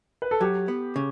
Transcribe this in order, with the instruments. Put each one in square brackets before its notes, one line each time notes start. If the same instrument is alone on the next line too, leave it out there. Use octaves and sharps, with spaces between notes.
[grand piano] B4
A4
[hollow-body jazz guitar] F#3 [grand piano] G4
[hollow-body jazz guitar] B3
C#3